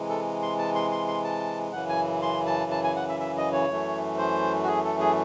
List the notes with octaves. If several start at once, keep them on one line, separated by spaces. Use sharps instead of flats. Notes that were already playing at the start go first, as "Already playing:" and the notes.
Already playing: C3 E3 G#3
A4
C6
A5
C6
C6
C6
A5
F#2 C#3 E3 F#5
G#5
C6
A5
A5
G#5
F#5
E5
E5
D#5
C#5
F#2 E3 A3
C5
F#4
G#4
A4
G#4